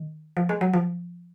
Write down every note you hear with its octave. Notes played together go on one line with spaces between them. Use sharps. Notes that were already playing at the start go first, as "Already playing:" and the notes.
Already playing: D#3
F3
G#3
F#3
F3